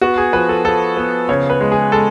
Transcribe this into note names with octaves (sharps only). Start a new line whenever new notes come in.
B3 F#4
G#4
F3 B4
A4
F3 A4
B3
C#3 C#5
B4
G#3
G#4
G#3 A4